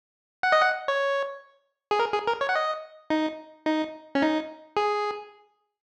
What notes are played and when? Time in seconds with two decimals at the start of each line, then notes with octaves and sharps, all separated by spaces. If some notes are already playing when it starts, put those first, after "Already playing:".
0.43 F#5
0.52 D#5
0.62 F#5
0.88 C#5
1.91 G#4
1.99 A#4
2.13 G#4
2.27 A#4
2.41 C#5
2.49 F#5
2.55 D#5
3.10 D#4
3.66 D#4
4.15 C#4
4.22 D#4
4.77 G#4